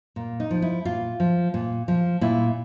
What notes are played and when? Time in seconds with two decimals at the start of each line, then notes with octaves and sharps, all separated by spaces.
0.16 A#2
0.40 D#4
0.51 F3
0.62 E4
0.85 A#2 F4
1.20 F3
1.54 A#2
1.88 F3
2.21 A#2 E4